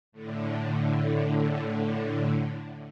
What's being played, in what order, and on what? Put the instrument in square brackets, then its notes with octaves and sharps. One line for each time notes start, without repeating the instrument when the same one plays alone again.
[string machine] A2 D3